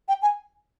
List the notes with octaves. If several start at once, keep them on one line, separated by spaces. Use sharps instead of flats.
G5
G#5